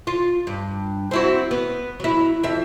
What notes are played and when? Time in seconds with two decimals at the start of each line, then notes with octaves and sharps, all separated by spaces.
0.07 F4
0.47 G2
1.11 C4 E4 F#4
1.51 B3
2.00 F#3 E4
2.43 F2 E5